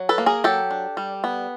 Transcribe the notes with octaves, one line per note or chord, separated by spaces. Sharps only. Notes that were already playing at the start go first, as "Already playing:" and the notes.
Already playing: F#3
A4 B4
A#3
G#4 A#4
F#3 G4 A4
D4
G3
B3